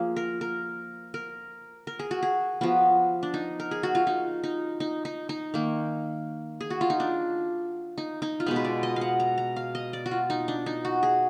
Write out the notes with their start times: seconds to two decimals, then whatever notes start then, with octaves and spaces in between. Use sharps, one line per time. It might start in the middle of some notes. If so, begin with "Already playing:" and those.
Already playing: F3 A#3 G#4
0.16 A#4
0.41 A#4
1.14 A#4
1.87 A#4
1.99 G#4
2.11 F#4
2.23 G#4
2.61 F3 B3 F#4
3.23 D4
3.34 D#4
3.60 A#4
3.71 G#4
3.83 F#4
3.95 F4
4.07 D#4
4.44 D#4
4.80 D#4
5.05 D#4
5.29 D#4
5.54 D#3 A#3
6.61 G#4
6.70 F#4
6.81 F4
6.90 D#4
7.00 D4
7.98 D#4
8.22 D#4
8.40 F4
8.46 B2 G#3 B3 D#4
8.56 B4
8.64 D5
8.83 D#5
8.96 F5
9.01 F#5
9.20 A#5
9.38 A#5
9.56 F5
9.75 D#5
9.93 D5
10.06 F#4
10.11 F4
10.30 D#4
10.48 D4
10.66 D#4
10.85 F#4
11.03 G#4